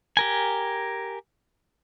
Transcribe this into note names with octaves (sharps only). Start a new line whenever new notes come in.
G4 A#4 G#5